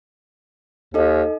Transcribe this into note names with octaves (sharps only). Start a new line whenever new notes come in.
D#2 D#4 A4 D#5